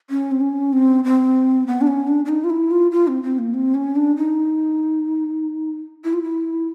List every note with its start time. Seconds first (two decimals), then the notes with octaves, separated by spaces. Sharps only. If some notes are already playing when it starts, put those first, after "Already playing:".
0.10 C#4
0.32 C4
0.41 C#4
0.73 C4
1.04 C4
1.67 B3
1.81 D4
1.87 C#4
2.08 D4
2.25 D4
2.29 D#4
2.44 F4
2.50 E4
2.71 F4
2.91 F4
3.08 C4
3.23 C4
3.39 A#3
3.54 C4
3.75 C#4
3.96 D4
4.16 D#4
6.04 E4
6.13 F4
6.23 E4